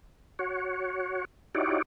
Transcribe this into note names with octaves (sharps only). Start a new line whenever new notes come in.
F#4 C#5
D#4 E4 F#4 G4 C#5 D5